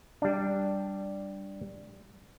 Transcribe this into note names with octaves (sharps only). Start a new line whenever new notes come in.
G3 D4